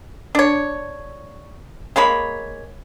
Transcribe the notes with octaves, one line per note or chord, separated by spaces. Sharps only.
D4 C#5
G#3 A#3 C#5 B5